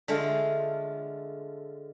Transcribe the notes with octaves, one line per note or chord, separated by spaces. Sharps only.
D3 G#3 A3 F4